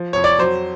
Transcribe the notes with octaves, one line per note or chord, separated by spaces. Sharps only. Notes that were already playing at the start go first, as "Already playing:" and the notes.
Already playing: F3
F2 C#5
D5
F#3 C5